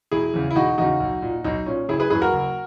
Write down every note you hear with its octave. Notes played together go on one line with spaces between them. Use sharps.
E1 E4 G#4
E2 C#3
E4
E1 D#4 F#4
E2 C#3 D#4 F#4
B1
A#2
B1 D#4
A#2 C#4
F#1 E4 G#4
G#4 B4
F#2 E3 G#4 B4
F#4 A#4
F#1